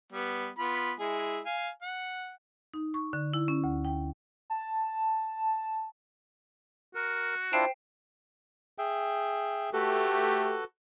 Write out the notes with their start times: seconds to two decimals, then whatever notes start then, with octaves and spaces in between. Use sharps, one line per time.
0.12 G3 B3
0.59 B3 F4 B5
0.99 G#3 E4 G#4
1.46 F5 G#5
1.82 F#5
2.74 D#4
2.94 C#6
3.13 D3
3.34 E4
3.48 C#4
3.64 D2
3.85 G5
4.50 A5
6.95 F#4 A#4
7.53 D4 E4 F4 C5 G5 C7 E7
8.78 G#4 E5 G5
9.73 A3 F#4 G4 A4 B4